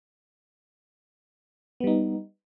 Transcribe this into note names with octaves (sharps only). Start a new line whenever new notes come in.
G3 B3 D#4